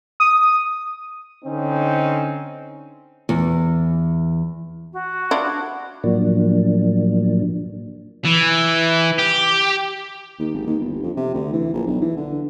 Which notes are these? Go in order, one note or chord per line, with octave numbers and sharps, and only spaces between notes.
D#6
D3 C4 C#4 D#4
E2
F#4
D4 E4 F4
A2 F3 F#3 A#3 D4
E3
G4
D#2
G#1
D#2
G1
F2
C3
D2
E3
A#1
B1
E3
D3